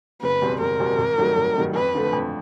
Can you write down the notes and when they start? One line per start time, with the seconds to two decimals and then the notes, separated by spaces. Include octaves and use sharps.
0.22 F#1 B4
0.42 E2 B2 G3 C4
0.60 F#1 A#4
0.80 E2 B2 G3 C4
0.98 G#1
1.18 G2 D#3 F#3 A3
1.37 G#1
1.55 G2 D#3 F#3 A3
1.75 F2 B4
1.95 D3 F3 A3
2.13 F2